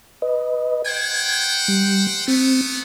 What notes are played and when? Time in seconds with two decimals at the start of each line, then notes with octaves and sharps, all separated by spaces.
0.22 B4 D#5
0.86 C5 F#5 G5 G#6
1.68 G3
2.28 A3 B3 C4